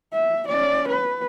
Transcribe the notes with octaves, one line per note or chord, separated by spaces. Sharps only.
E5
C#4 D5
B4